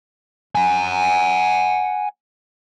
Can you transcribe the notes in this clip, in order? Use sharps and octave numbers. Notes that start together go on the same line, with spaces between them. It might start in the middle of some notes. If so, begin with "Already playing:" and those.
F#5 G#5